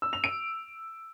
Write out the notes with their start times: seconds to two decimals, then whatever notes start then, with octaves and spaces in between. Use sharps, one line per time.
0.02 E6
0.13 F7
0.24 D7